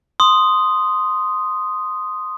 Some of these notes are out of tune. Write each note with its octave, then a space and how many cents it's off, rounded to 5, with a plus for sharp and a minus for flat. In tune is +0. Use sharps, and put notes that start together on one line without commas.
C6 +0 D#6 +0